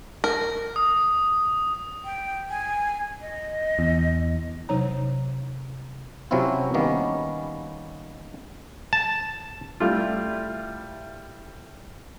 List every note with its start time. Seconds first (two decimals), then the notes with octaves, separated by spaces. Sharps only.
0.24 A#4
0.76 D#6
2.05 G5
2.50 G#5
3.22 D#5
3.79 E2
4.69 C3 F#3 D#4 C#5 A#5
6.31 C3 F#3 C4 C#4 E4 F4
6.74 D#3 G3 A#3 B3 C#4
8.93 A5
9.80 G3 A3 E4 F4